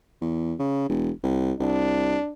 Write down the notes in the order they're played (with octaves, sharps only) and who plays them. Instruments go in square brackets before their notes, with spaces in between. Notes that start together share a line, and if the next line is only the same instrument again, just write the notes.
[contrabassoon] E2
C#3
E1
C2
[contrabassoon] C2 [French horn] D4